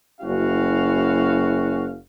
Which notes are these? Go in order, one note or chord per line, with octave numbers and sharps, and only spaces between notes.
F#1 C#4 E4 F#4 F5